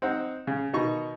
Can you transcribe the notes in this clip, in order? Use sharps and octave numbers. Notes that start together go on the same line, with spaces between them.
C4 D#4 F#5
C#3
B2 D#3 D#4 C#6